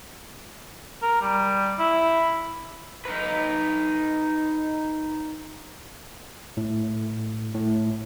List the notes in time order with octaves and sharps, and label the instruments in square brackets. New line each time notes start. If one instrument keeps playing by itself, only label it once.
[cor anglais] A#4
G3
E4
[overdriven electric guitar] D#4 B4
[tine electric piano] A2
A2